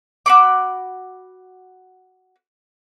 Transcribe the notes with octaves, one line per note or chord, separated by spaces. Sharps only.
F#4 B5 D6